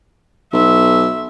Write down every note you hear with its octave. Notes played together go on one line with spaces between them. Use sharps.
B1 E5